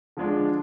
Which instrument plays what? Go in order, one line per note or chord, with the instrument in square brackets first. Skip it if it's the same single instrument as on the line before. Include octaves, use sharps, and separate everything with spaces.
[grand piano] D3 F3 G#3 D4